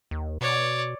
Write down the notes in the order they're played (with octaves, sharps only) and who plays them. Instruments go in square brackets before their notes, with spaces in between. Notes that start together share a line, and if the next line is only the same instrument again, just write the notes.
[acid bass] D#2
[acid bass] B2 [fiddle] C#5 D5